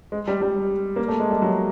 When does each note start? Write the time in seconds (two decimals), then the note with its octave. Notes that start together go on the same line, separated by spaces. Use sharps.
0.12 G#3
0.28 G3
0.42 G3
0.96 A#3
1.08 A3
1.20 G#3
1.30 G3
1.42 F#3